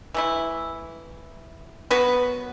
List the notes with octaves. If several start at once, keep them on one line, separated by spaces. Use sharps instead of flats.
E3 A3 E4
F#3 B3 F#4 B4